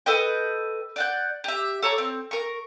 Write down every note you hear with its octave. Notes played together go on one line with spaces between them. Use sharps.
A4 B4 D#5 G5
D5 F#5 G6
G4 E5
A4 C#5 A#5 D6
C4
A#4 C#6